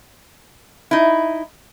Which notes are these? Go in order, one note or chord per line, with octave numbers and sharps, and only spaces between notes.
D#4 E4